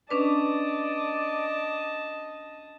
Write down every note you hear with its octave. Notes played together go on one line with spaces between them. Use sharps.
C#4 D4 B4 D5 D#5 A5